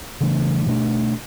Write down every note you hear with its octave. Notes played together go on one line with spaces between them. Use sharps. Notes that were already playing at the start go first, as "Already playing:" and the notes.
C#3 E3 A3 D4
B2 A3 D4